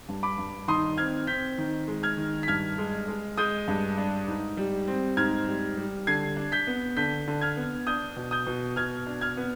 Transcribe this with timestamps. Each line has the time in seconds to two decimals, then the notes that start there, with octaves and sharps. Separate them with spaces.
0.09 G2
0.23 B5 D6
0.38 G2
0.68 D#3 C6 D#6
0.97 C4 F6 G#6
1.27 C4 G6 B6
1.58 D#3
1.88 G#3
2.03 F6 G#6
2.17 D#3
2.43 B6
2.48 G2 F6 G#6
2.78 G#3
3.08 G#3
3.37 G#3 D#6 G6
3.68 G2
3.98 D4
4.28 G#2
4.57 G3
4.88 C4
5.17 G#2 F6 G#6
5.47 G3
5.77 G3
6.07 D3 G#6 C7
6.36 D4
6.52 G6 B6
6.67 B3
6.97 D3 G6 B6
7.28 D3
7.41 F6 G#6
7.57 B3
7.87 D4 D#6 G6
8.16 B2
8.31 D#6 G6
8.47 B2
8.76 B2 F6 G#6
9.07 D4
9.21 F6 G#6
9.37 B3